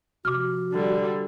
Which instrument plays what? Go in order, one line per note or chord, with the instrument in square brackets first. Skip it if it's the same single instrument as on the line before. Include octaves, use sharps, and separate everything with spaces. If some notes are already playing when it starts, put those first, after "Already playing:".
[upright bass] C3 F3 [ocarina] F#4 [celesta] D6 F6
[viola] D3 G3